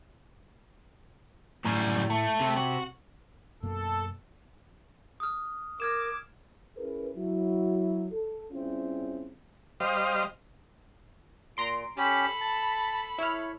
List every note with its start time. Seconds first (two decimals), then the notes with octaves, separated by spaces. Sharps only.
1.65 F#2 A2 G3
2.10 A3
2.40 C3
2.57 F#4
3.63 F#2 B2 A#3 A4
5.20 D#6 F6
5.80 A#4 D6 F6 G#6 E7
6.77 C#4 E4 G#4 A#4 B4
7.15 F#3 E4
8.12 A4
8.52 G3 C4 C#4 E4 F4 G#4
9.80 G3 C5 D#5 F5
11.57 A#2 A#5 C6 D7
11.97 C#4 G4 A4 B5
12.41 A5
13.19 E4 C#5 F6